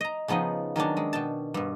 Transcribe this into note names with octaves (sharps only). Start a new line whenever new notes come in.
D#5 A#5
C#3 F3 B3 D#4 D#5
D#3 F#3 C#4 D4
G#3
B2 G5 A5
G2 B2